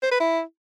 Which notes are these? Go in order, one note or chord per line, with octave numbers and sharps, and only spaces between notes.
C5
B4
E4